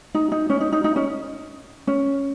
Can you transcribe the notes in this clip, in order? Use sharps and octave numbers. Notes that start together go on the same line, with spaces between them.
D#4
D#4
C#4
D#4
D#4
D#4
C#4
C#4